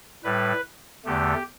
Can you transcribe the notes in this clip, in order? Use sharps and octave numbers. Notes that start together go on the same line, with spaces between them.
A2 G3 B4
E2 D3 A3 G4